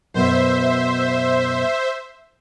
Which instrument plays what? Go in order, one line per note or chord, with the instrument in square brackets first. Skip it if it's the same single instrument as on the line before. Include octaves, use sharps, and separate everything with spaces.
[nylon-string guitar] F#2 B2 B3 [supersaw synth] C5 E5